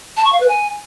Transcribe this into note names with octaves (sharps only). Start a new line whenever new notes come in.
A5
C#6
F5
B4
G#5